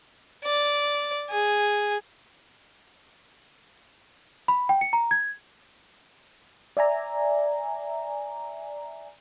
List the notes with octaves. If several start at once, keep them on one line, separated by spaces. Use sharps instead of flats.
D5
G#4
B5
G5
C#7
A#5
G#6
D5 E5 G#5 A#5